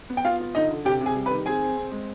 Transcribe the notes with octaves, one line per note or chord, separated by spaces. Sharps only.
B3
G5
B3 F4 F5
F4
D3 D#4 D#5
D3
C3 G4 G5
C3
G#4 G#5
G3
B4 B5
D#3
C4 G#4 G#5
C4
C4
G#3